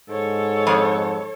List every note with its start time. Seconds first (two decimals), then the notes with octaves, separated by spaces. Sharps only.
0.10 G#2 A4 C#5
0.67 F2